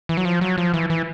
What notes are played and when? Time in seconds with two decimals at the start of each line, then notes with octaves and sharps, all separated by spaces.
0.09 E3
0.17 F#3
0.25 F3
0.41 F#3
0.58 F3
0.74 E3
0.90 E3